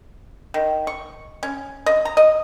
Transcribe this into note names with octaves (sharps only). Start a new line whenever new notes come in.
D#3
C#6
C#4
D#5
A#5
D#5